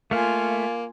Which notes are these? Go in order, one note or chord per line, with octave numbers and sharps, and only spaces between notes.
A3 A#3 F4 F5 G#5